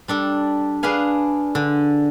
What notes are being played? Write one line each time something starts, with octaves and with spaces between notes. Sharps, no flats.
G3 D4 A4
D4 G#4 B4 F5 G#5
D3